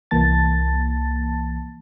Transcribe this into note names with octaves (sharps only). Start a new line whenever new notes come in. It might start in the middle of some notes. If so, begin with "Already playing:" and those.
C2 E3 A#3 A5 A6